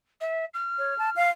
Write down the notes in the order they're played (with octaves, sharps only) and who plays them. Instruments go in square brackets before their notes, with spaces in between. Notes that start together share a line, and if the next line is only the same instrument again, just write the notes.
[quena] E5
F6
[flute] C#5
A5
F5